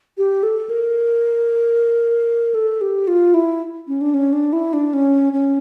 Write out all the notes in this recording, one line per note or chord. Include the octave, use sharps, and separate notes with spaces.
G4
A4
A#4
A4
G4
F4
E4
C#4
D4
C#4
D4
E4
D4
C#4
C#4